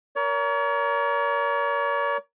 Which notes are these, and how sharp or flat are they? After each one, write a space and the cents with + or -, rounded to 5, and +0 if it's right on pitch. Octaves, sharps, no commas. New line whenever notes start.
A#4 +10 C#5 +40